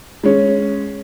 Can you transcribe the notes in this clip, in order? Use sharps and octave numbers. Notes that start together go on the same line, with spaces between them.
G#3 C#4